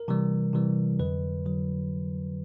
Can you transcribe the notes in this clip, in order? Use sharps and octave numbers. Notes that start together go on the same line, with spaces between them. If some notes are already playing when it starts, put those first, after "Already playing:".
Already playing: A#4
C3 E3 G3
C3 E3 G3
F2 D3 F#3 B4
D3 F#3